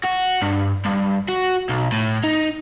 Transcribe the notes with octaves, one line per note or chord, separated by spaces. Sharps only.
F#4
G2
G2
F#4
B1
A2
D#4